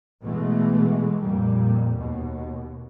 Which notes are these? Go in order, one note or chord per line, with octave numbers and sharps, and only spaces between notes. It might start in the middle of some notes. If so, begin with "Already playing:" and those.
B2 E3 G#3 A3
F2 A#2 G3
D#2 B2